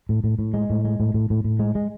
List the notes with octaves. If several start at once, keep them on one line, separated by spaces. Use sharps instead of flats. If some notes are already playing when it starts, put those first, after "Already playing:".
A2
A2
A2
G#3
A2
G#3
A2
A2
A2
A2
G#3
G#3